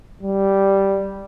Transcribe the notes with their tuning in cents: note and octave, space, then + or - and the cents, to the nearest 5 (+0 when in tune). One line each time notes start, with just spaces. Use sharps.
G3 -5